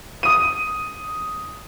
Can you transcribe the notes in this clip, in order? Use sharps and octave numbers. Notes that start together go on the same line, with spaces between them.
D#6 D#7